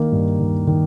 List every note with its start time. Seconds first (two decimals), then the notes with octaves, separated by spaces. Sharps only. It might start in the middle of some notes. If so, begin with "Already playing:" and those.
Already playing: D#3 A#3
0.12 G2
0.39 D#3
0.67 D#3